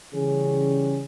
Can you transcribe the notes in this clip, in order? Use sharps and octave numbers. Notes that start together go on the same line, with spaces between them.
C#3 E3 G3 C#4 G#4